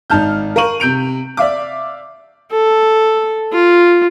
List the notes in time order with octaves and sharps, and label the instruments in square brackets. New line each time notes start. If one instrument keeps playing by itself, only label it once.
[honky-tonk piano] G#1 D#4 A5 F6 G6
A#4 F5 C#6 D#7 F#7
C3 G6 D7 F7
D5 E5 F5 D6
[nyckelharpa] A4
F4